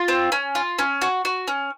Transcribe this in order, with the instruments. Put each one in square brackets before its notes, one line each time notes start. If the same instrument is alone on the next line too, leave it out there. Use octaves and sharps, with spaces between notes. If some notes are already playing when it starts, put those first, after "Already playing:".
Already playing: [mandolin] F4
C4
C#4
F4
C#4
F#4
F#4
C#4